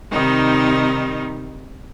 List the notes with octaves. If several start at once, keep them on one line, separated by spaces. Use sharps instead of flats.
C3 D#3 G3 D#4